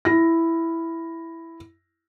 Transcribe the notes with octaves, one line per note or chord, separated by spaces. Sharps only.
E4 A#6